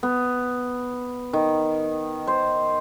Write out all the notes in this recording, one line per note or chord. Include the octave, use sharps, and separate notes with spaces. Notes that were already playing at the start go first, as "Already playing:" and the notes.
B3
D#3
C5